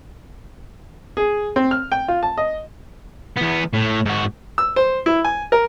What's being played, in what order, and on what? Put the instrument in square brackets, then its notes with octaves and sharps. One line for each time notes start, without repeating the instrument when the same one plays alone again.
[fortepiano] G#4
C4
F6
G5
F4
A5
D#5
[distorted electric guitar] E2 B3
A2
G#2 F#4
[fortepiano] E6
C5
E4
G#5
A#4